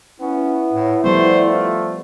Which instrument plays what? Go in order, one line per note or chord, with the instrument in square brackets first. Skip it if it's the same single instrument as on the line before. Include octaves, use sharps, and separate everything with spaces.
[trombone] B3 [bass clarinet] C#4 [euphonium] E4
[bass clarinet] A2
[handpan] F3 G3 B3 [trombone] A3 [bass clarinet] C5
[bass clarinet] F4